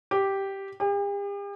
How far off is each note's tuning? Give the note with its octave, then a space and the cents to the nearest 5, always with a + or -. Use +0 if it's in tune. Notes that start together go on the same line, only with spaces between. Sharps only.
G4 -5
G4 +45